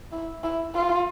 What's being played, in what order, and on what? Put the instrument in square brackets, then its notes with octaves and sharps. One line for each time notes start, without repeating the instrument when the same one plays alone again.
[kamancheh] E4
E4
F4